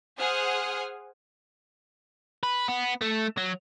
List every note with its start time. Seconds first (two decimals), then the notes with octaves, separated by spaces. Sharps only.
0.18 G#4 C5 F#5 G#5 D#6 F6
2.43 B4
2.68 B3
3.01 A3
3.37 F#3